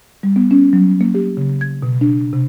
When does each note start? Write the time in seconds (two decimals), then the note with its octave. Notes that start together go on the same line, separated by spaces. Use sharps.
0.23 G3
0.36 B3
0.51 C#4
0.73 F#3
1.01 A#3
1.15 G4
1.37 C#3
1.61 G#6
1.83 B2
2.01 D4
2.33 C3